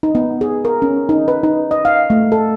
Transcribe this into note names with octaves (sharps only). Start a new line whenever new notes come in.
D#4
B3
G#4
A#4
C#4
D#4
B4
D#4
D#5
F5
A3
A4